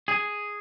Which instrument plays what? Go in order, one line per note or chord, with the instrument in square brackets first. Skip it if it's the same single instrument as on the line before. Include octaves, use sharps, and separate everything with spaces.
[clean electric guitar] G#4